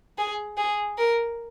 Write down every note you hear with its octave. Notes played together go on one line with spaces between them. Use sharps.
G#4
G#4
A#4